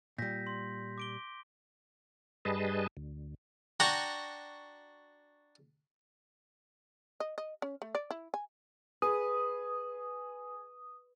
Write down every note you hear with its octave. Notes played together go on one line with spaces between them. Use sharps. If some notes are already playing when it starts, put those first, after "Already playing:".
A#2 G3 G6 A#6 B6
C6
D6 D7 G7
G2 G3 G#4 B4 D#5 A5
D2
D4 F#4 F#5 G5 A#5 C#6
D#5
D#5
C#4
A3
D5
E4
G#5
G#4 B4 D#6